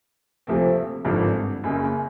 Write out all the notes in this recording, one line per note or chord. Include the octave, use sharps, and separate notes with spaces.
D2 C3 F3 A3 C4
G#1 G2 D3 F3
F#1 F#2 C#3